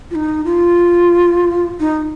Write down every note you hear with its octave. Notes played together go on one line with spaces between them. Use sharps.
F4
D#4
F4
D#4